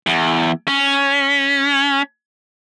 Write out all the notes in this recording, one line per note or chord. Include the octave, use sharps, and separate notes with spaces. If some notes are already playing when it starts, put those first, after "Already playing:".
E2
C#4